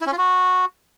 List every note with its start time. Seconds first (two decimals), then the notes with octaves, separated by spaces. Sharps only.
0.01 E4
0.06 C#4
0.12 F4
0.18 F#4